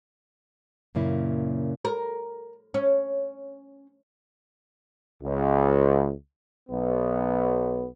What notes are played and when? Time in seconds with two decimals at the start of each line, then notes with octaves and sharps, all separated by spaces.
0.95 F#2 A#2 C#3 A#3 E4
1.85 A#4
2.74 C#4
5.22 C#2
6.69 B1 B3